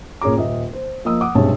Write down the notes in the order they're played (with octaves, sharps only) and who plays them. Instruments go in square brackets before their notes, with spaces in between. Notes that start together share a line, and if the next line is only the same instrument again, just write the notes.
[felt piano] A#2 C#4 G#4 A#5 D6
D#1 D#5 E5
C5
F3 A#3 D#5 D#6 E6
F#5 D6 D#6
B1 G2 C3 G#3 C#5 A5